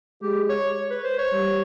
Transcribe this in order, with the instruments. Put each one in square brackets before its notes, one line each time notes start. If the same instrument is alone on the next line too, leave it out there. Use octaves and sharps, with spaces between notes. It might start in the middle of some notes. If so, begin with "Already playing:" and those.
[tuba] G#3 [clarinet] G4
[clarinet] C#5
C#5
B4
C5
C#5
[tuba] G3